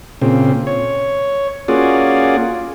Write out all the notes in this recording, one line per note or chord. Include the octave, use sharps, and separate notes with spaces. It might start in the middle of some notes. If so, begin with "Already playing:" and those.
A#2 C#3 C4
C#5
A#3 C#4 F4 F#4 G#4 D5